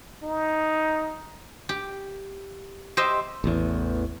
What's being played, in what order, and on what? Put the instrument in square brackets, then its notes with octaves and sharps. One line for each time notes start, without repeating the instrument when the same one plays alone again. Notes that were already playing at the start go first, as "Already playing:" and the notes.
[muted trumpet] D#4
[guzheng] G4
G4 C5 D#5 E5
[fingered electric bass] A1 E2